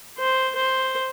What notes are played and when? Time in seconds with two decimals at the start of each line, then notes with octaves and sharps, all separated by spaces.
0.18 C5
0.55 C5